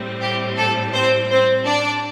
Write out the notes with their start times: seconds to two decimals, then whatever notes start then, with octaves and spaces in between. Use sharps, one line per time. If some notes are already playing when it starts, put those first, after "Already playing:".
Already playing: A2 G3 C4
0.21 G4
0.57 A4
0.94 C4 C5
1.30 C4 C5
1.67 D4 D5